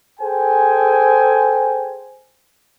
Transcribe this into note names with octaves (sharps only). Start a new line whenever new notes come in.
G#4 A4 C5 G5 G#5